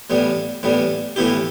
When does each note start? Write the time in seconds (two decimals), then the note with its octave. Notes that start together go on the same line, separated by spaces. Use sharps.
0.10 A2 E3 G3 B3
0.63 A2 E3 G3 B3
1.16 A2 E3 B3 E4 G4